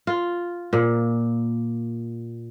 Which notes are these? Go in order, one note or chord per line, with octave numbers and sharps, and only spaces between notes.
F4
A#2